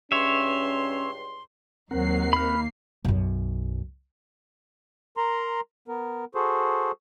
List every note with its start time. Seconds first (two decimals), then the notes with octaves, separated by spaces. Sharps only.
0.12 C#2 G2 C#4 C#5 E5 C6
1.91 D#2 F#3 C4 D#4 A#4 F#5 C7
2.33 A#3 B5 F6
3.05 B1 F#2
5.17 A#4 A#5 C6
5.88 B3 A#4
6.35 F#4 G#4 A4 C5